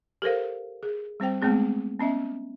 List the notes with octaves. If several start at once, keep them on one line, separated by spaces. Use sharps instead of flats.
G4 A4 A#4 C5 F5
G#4
G3 C4 C5 G5
G#3 A3 B3 C4 G#4
B3 C#4 D#5 E5